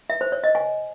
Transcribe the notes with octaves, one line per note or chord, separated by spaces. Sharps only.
E5
C5
C#5
D#5
G#5